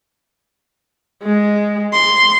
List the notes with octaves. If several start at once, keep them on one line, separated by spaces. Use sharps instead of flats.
G#3
C6